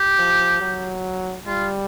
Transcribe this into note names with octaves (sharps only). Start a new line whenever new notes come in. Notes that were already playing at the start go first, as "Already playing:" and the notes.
Already playing: G4
F3
F#3
G3 F4